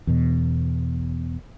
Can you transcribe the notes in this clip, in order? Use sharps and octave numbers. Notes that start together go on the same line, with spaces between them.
E2 B2